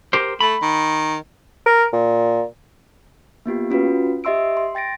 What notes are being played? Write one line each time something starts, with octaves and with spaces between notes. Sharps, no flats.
G4 A#4 C5
A3 B5
D#3
A#4
A#2
A#3 B3 F4 G4
C#4 F4 F#4 B4
G4 D#5 E5 C6 E6 D7
C6
G5 A6 A#6 D7